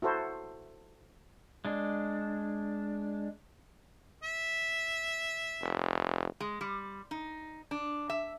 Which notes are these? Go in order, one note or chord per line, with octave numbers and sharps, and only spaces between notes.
E4 F#4 A4 C5
G#3 D4
E5
F1
G#3
G3
D#4
D4
E5